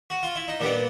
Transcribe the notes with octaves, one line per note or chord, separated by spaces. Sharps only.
F#4
F4
E4
D#4
A#2 G3 B3 D4